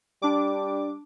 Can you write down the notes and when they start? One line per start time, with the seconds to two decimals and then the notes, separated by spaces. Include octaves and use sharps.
0.22 G3 D4 D6